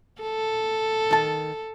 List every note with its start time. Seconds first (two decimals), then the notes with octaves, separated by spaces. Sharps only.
0.22 A4
1.11 D#3 A5